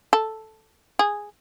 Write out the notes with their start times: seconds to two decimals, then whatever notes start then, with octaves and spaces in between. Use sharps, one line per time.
0.13 A4
0.99 G#4